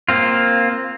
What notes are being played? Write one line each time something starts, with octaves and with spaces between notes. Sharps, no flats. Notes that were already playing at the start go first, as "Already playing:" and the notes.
A#3 C4 F4